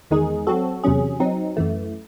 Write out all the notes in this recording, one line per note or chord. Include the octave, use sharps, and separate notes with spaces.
E2 D#3 G#3 D#4 G#4
F#3 C4 F#4 A4
E2 C3 F#3 C#4 G#4
F#3 C4 D#4
F#2 E3 A3